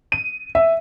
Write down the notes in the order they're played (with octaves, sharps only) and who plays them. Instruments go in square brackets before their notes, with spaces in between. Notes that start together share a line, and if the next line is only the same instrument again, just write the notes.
[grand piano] D#7
E5